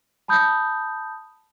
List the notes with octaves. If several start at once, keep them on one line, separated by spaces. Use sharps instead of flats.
A5 B5 D#6 G6